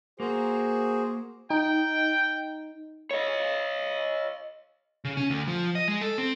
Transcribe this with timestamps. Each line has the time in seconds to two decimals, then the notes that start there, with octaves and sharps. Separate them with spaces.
0.20 A#3 F#4 G#4 C5
1.50 D#4 G5
3.11 C#5 D#5
5.04 C#3
5.17 C#4
5.30 D2
5.47 F3
5.75 D#5
5.88 G#3
6.01 A4
6.18 C4